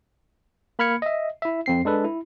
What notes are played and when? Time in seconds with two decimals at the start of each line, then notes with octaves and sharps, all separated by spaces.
0.79 A#3 B5 F6 G#6 C#7
1.02 D#5 E5
1.42 E4 E5
1.66 F2 C4 C7
1.85 G#3 D4 A4 B4
2.04 E4